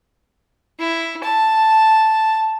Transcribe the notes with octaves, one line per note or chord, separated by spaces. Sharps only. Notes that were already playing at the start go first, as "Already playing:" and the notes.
E4
A5